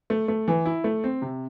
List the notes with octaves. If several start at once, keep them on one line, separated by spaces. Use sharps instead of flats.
A3
A3
E3
E4
A3
C4
C3